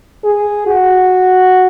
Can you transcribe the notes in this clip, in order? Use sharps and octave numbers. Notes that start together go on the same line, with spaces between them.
G#4
F#4